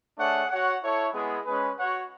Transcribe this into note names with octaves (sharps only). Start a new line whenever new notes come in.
A3 D4 G#4 C#5 F#5
F#4 C#5 F#5
E4 A4 C#5
G#3 B3 E4 G#4
G#3 C#4 G#4 B4
F#4 C#5 F#5